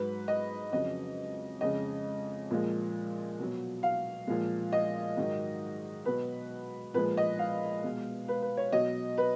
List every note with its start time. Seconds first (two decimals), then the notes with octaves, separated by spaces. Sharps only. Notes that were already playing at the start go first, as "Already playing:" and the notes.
Already playing: G#2 F#3 B4
0.28 D#5
0.72 F2 C#3 F#3 D#5
1.61 F2 C#3 G#3 D#5
2.51 A#2 F3 G#3
3.39 B2 F#3
3.83 F5
4.27 A#2 F3 G#3
4.72 D#5
5.17 G#2 D#3 F#3
6.05 B2 F#3 B4
6.94 A#2 F3 G#3 B4
7.17 D#5
7.39 F5
7.84 B2 G#3
8.28 B4
8.42 B4
8.57 C#5
8.72 B2 F#3 D#5
9.18 B4